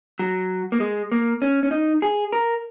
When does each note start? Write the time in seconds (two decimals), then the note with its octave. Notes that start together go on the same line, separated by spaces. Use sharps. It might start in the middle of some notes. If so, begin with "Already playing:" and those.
0.19 F#3
0.72 A#3
0.80 G#3
1.12 A#3
1.42 C#4
1.63 C#4
1.71 D#4
2.02 G#4
2.32 A#4